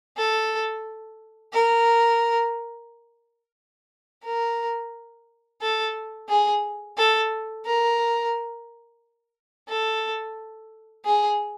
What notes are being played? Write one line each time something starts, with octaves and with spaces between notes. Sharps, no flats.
A4
A#4
A#4
A4
G#4
A4
A#4
A4
G#4